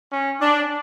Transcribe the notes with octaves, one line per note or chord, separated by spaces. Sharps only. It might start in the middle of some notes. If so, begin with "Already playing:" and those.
C#4
D4